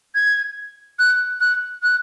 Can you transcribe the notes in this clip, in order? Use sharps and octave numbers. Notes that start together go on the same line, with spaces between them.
G#6
F#6
F#6
F#6